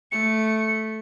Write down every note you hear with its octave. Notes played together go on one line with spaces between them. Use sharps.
A3 C#7